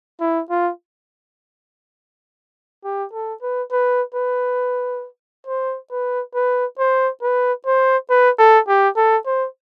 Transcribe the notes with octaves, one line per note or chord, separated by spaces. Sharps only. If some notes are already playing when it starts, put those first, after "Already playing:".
E4
F4
G4
A4
B4
B4
B4
C5
B4
B4
C5
B4
C5
B4
A4
G4
A4
C5